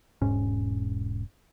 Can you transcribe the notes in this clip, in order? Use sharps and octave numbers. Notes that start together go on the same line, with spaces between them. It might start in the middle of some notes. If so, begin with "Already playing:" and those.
E1 G#2 C#4